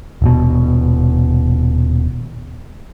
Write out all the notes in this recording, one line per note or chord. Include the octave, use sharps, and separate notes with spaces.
D#1 B2